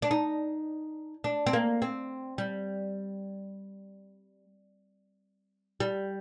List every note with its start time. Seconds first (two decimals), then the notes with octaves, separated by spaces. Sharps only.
0.02 D4
0.11 D#4
1.24 D4
1.47 C4
1.53 A#3
1.82 C4
2.38 G3
5.80 G3